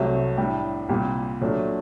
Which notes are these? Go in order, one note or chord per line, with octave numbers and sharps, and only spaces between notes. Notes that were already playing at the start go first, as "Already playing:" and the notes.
Already playing: C2 C3 F#3 A3
A2 G3 D4
C2 A#2 G3
A#2 F#3 A3 D4